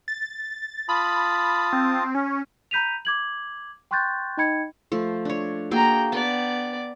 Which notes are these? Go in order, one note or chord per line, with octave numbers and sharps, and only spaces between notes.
A6
F4 A5 B5 D#6
C4
C#4
A#5 B5 G6 B6 D#7 F7
D6 G#6 F#7
G5 C6 C#6 F#6 G6 A6
D#4 D#5 G5 B5 G#6 C#7
F3 A3
D4 C#5
A#3 F#4 G#4 G5 A#5
B3 D5 G5 A5